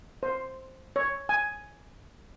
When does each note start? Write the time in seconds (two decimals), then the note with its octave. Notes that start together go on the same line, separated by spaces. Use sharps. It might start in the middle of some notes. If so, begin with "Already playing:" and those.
0.23 C5
0.96 C#5
1.29 G#5